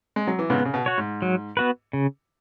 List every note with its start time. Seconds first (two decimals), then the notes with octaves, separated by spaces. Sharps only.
0.16 G#3
0.27 F#3
0.39 E3
0.50 G#2 C#3 B3
0.65 C#3
0.74 B2
0.86 F#4 C#5
0.98 G#2
1.22 F#3
1.57 B3 F#4 B4
1.93 C#3